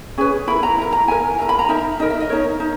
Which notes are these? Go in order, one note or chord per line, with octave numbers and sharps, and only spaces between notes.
C#4 G#4 B4
E4 A#4 B5
A#5
E4 A#4
A#5
E4 A#4 G#5
E4 A#4 A#5
B5
A#5
D#4 A#4 E5
D#4 A#4 D#5
E5
D#5
D#4 A#4 C#5
D#4